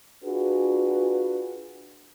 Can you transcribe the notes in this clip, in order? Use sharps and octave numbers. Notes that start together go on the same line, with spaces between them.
D4 F4 F#4 G#4 B4